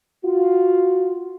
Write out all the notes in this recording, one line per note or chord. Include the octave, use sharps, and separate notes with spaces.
F4 F#4